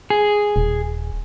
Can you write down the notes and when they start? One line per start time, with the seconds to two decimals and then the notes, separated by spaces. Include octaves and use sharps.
0.10 G#4
0.56 D#1